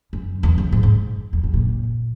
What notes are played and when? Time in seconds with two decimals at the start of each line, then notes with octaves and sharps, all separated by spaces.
0.13 F#2
0.43 E2
0.58 F#2
0.72 G#2
0.83 G#2
1.33 E2
1.44 F#2
1.54 A#2